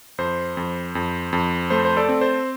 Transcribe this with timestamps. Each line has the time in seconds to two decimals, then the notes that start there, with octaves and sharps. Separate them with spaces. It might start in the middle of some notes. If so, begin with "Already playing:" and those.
0.18 F2 C5
0.57 F2
0.95 F2
1.33 F2
1.70 A3 C5
1.85 C5
1.97 A4 D5
2.09 C4
2.21 C5